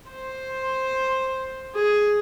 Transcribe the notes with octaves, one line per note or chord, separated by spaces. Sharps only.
C5
G#4